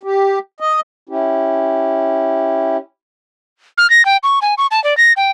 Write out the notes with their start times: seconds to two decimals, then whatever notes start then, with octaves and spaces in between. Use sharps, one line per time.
0.03 G4
0.60 D#5
1.09 C#4 E4 G4
3.78 F6
3.90 A#6
4.05 G5
4.23 C#6
4.42 G#5
4.58 C#6
4.71 A5
4.84 D5
4.97 A#6
5.17 G5